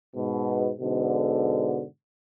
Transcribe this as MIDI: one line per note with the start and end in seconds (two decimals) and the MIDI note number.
0.16 0.71 44
0.16 0.71 47
0.80 1.85 44
0.80 1.85 47
0.80 1.85 50